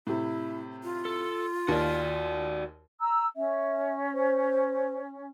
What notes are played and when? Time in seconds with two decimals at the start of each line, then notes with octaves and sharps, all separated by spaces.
0.07 A2 C3 E4
0.83 F4
1.05 A4
1.68 D#2 F#4 D5
3.00 A#5 E6
3.36 C#4 E5
4.14 C5